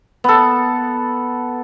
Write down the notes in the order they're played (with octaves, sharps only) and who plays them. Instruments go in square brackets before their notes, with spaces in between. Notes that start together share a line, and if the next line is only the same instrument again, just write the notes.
[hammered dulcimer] B3 A4